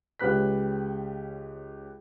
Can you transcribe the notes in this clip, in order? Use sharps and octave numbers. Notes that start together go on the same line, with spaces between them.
C#2 C#4 G4 B4 F#6 B6